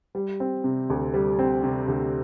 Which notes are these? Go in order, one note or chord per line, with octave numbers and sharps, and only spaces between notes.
G3
C4
C3
D2
G3
C4
C3
D2